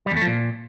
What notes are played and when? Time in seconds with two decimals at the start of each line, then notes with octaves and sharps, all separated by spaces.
0.06 G3
0.11 E2
0.16 A3
0.22 F3
0.27 A#2